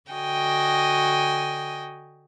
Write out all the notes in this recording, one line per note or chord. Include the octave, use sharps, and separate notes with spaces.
D3 F#4 D#5 G5 G#5